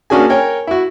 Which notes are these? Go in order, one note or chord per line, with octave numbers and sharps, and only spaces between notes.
A#3 C#4 D4 F#4 G#4 G#5
A#4 C#5 G5 G#5
E4 F#4